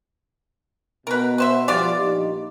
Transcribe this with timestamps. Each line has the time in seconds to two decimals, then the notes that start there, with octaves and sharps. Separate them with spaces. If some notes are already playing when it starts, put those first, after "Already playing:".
1.07 B2 A#4 B4
1.38 B4 C5 E5
1.68 F3 G3 B3 F4 D5
2.00 A#1 D#4 G4